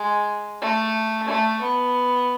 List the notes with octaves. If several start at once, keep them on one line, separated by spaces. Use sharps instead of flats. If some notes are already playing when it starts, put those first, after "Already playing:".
Already playing: G#3
A3
A3
B3